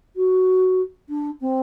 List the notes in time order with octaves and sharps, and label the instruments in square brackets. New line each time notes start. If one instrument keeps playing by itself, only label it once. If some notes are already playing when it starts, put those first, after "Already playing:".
[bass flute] F#4
D4
C4